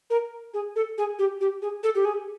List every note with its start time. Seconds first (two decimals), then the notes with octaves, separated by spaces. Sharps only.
0.10 A#4
0.54 G#4
0.76 A4
0.98 G#4
1.19 G4
1.41 G4
1.62 G#4
1.83 A4
1.95 G4
2.05 G#4